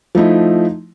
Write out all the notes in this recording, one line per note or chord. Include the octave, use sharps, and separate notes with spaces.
F3 A3 D#4 E4